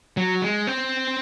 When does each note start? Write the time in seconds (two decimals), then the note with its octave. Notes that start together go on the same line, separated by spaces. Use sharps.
0.17 F#3
0.42 G#3
0.67 C4